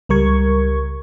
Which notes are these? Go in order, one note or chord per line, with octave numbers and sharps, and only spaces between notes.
C#2 G3 A#4 C#6 G#6